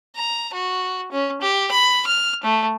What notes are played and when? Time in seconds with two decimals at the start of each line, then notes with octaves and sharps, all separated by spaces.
0.17 A#5
0.54 F#4
1.12 C#4
1.41 G4
1.71 B5
2.07 F6
2.44 A3